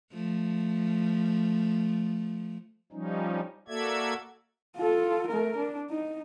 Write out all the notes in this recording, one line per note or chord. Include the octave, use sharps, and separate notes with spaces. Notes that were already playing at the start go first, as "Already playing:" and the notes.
F3 A3
F3 G3 C#4 D#4
A#3 F#4 A4 D5 E5 G#6
F4 A4
A3 A#4
D4
D#4